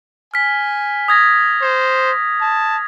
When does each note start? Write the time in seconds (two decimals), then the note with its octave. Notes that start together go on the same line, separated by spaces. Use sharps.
0.34 G#5 F6 B6
1.08 D#6 G#6 A#6
1.62 C5
2.41 A5